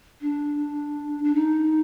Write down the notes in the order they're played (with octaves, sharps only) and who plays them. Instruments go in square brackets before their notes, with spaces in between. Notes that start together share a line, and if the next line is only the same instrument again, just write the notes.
[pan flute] D4
D4
D#4